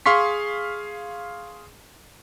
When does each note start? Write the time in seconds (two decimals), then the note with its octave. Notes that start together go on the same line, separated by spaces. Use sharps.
0.06 G#4 F5 C6 C#6 B6